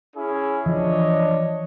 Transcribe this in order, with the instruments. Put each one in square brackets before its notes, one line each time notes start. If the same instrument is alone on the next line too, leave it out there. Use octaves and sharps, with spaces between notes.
[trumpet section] C#4 E4 G#4
[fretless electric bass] E3 F3 [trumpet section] D4 C#5 D#5